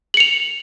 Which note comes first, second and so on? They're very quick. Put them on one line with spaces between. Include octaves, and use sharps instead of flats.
F#7 C#7 F7